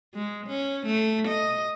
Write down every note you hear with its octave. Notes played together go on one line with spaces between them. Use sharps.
G#3
C#4
A3
D#5